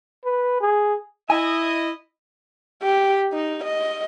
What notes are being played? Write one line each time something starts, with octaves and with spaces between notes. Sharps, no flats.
B4
G#4
E4 D#5 G#5
G4
D#4
D#5